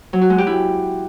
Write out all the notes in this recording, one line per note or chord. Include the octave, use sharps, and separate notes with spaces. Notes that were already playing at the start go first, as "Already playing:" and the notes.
F#3
F#4
G#3
G4
E4